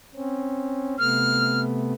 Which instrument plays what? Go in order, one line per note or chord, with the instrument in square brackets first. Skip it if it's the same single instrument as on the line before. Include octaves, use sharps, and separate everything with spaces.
[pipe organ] C4 C#4
[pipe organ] C3 A3 B3 [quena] F6